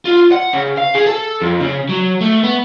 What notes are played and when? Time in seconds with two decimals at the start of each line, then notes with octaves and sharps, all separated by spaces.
0.05 F4
0.32 F#5
0.54 C#3
0.78 F5
0.95 G#4
1.06 A4
1.42 F2
1.60 C#3
1.89 F#3
2.21 A3
2.43 B3